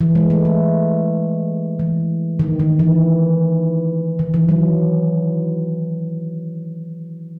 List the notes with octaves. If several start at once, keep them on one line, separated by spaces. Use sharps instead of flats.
E3
G#3
A3
G#3
E3
D#3
D#3
E3
D#3
E3
F#3